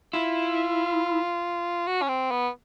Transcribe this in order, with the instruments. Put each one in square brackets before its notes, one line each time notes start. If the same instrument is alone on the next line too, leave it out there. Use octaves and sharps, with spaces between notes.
[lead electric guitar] E4 [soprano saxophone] F4
[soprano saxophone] F#4
C#4
C4
B3